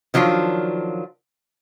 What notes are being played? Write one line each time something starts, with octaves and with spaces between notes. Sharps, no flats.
D#3 F3 F#3 D4 F4